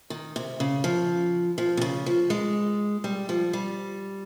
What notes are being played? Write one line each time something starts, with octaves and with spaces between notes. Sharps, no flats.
D#3
C3
C#3
F3
F3
C3
C#3
F3
G#3
G3
F3
G3